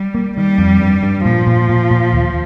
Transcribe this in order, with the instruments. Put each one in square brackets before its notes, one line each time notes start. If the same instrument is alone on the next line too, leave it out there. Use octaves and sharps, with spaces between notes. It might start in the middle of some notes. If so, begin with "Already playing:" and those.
Already playing: [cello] G3
[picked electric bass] A#3
[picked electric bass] D#3 [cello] G3
[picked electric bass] F2
G2
G2
[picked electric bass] A#2 [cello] F3
[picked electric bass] A#2
A#2
A#2
D#2